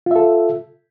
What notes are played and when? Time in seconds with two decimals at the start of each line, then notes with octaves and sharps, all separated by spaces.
0.06 F4
0.11 E5
0.16 A4